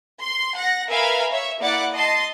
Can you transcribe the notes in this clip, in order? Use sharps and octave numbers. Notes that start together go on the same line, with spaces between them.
C6
F#5 A#6
A#4 B4 E5 F5 G#5 B5
C#5 E5
A#3 E4 D5 F#5 D6 C#7
D#5 A5 C6